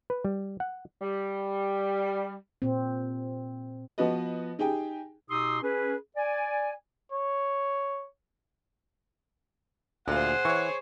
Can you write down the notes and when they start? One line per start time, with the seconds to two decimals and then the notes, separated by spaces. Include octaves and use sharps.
0.10 B4
0.25 G3
0.60 F#5
1.01 G3
2.62 A#2 C4
3.98 F3 B3 F#4 B4 D#5
4.59 D#4 G4 G#4 G5
5.30 B2 D#4 G4 C6 D#6 E6
5.63 C#4 G#4 B4
6.17 D5 G#5
7.12 C#5
10.08 D2 A#2 G#4 C5 F5 F#5
10.45 E3 C#5 C#6